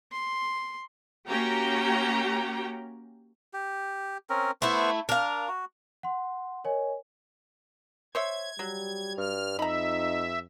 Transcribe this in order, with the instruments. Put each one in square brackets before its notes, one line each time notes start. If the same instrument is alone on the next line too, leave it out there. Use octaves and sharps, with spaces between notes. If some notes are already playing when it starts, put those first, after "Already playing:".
[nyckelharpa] C6
[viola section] A#3 C#4 F#4 G4 G5 A#5
[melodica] G4
C4 C#4 A#4
[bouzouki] A3 E4 [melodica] B3 C5 C#6
[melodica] D4 [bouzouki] A#4 F5
[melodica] F#4
[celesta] F#5 C6
A#4 C#5 D#5 G#5
[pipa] C5 C#5 E5 [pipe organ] G#6
[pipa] F#3 [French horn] G3
[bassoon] G2 [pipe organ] F6
[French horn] F2 [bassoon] D#4 [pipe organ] E5 [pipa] A#5 B5